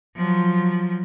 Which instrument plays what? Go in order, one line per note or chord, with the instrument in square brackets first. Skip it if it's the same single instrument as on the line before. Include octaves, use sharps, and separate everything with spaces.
[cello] F3 F#3